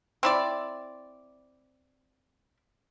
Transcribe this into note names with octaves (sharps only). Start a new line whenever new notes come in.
C4 E4 D5